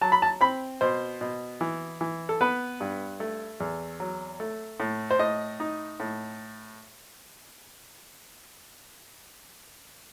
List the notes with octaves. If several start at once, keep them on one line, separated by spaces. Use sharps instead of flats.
F#3 A5
B5
A5
C4 B5
B2 C5
B2
E3
E3
A4
B3 B4
G2
A3
E2
F#3
A3
A2
C5
A2 D#5
D#4
A2